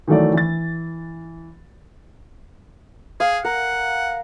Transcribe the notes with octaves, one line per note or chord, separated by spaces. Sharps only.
D#3 E3 F#3 A3 E4 D5
E3 A6
G#4 F5
A#4 F#5